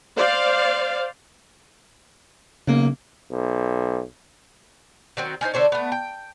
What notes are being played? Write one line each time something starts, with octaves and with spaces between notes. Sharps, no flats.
C5 D5 F5
B1 C#3 A#3
B1
D#3 F#3 C4
C#4 D#4 A4 C5
D3 D4 C5 C#5
A3 B3
G5